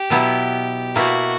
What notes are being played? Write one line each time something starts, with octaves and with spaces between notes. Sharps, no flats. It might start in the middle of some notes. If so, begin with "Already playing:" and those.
Already playing: G4
B2 F#3 B3 E4
B2 A#3 E4 F#4